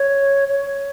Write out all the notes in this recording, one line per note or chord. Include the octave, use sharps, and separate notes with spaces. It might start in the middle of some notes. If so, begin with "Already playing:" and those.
Already playing: C#5
C#5